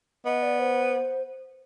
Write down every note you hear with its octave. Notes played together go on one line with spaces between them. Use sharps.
B3 D#5
D5
C5